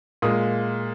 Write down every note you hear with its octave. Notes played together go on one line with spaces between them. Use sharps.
A#2 G#3 D#6